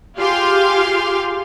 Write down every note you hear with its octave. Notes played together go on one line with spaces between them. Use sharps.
F4 G4 G#4 F5 C6